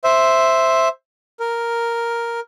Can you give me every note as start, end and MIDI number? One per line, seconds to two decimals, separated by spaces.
0.04 0.89 72
0.04 0.89 76
1.40 2.40 70